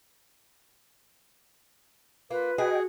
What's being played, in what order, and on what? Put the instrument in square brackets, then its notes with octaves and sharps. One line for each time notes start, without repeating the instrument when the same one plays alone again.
[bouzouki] A#3 [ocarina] F4 [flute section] B4
[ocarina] F#4 [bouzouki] G#4 [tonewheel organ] D#5 G5